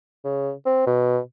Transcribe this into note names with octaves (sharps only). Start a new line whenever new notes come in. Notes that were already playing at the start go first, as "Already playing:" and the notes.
C#3
C4
B2